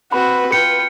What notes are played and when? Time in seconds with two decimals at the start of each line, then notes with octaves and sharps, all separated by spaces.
0.12 C4 F#4 B4 B5
0.52 F4 G5 C#7